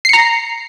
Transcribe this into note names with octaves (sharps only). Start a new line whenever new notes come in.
A#5 C7 C#7